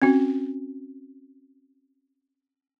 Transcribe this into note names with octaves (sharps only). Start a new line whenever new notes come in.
C4 C#4 F#4